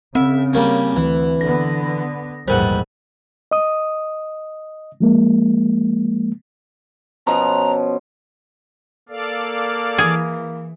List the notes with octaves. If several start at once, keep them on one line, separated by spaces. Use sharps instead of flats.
C#3 C4 E5
G3 A#3 C#4
D2 E3
D3 B3 A#6
A#1 E2 G#2 G3 A#4 C5 F#5
D#5 D#6
F3 G#3 A#3
B2 F3 C#4 A#5
A#3 A4 D5 F5
E3 G#4